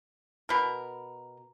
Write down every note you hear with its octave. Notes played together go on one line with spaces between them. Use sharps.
B2 A#4